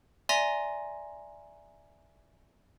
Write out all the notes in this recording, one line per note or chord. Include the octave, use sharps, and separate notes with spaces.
D5 E5 G#5 A#5 C6 A#6